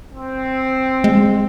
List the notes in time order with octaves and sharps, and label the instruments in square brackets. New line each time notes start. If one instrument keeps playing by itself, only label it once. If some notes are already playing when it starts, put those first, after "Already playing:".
[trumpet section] C4
[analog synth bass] G#3